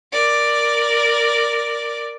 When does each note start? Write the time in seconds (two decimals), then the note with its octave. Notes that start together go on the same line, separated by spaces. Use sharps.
0.12 A#4 D5